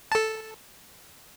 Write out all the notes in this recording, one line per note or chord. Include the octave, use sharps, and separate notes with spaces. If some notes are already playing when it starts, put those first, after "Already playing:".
A4 A5